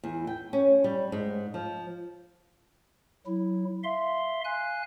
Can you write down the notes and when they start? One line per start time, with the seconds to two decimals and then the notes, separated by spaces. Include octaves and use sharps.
0.04 E2
0.27 G5
0.53 C#4
0.84 G3
1.12 G#2
1.54 F3
3.26 F#3 E4
3.84 E5 F5 C6
4.44 F5 G#5 F#6